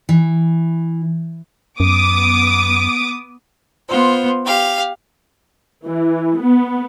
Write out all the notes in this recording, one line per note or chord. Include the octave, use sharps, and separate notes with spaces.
E3
F#2 B3 D6 D#6
B3 F4 C5
G4 F5
E3
B3